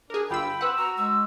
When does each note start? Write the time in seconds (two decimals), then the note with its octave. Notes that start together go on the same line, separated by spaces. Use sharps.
0.10 D4 G#4 A#4
0.30 G1 F4 G5 B5 E6
0.61 C4 B4 F#5 E6
0.78 F#4 A#5
0.97 G#3 E6